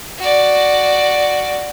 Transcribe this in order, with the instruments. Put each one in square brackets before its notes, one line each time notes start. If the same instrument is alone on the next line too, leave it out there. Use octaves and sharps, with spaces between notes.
[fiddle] F#4 D5